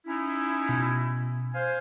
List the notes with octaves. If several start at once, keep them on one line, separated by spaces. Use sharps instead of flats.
C#4 D#4 E4
B2
C5 F5 G#5